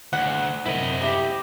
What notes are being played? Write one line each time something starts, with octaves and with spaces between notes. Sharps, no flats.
D2 F#5
F#2 C3 E4 D#5
G4 E5